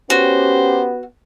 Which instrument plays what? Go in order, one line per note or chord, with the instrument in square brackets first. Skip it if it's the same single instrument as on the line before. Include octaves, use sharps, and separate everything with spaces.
[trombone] B3 [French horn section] C#4 G4 [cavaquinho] F#4 [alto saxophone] C5